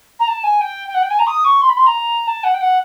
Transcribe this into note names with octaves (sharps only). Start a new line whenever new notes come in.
A#5
A5
G#5
G5
G5
F#5
G5
G#5
A#5
D#6
C#6
C6
B5
C6
A#5
A5
F#5
G5
F#5